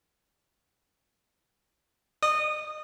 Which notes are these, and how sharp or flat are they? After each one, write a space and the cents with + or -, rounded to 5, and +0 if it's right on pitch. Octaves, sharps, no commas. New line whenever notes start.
D#5 -35 D#6 -15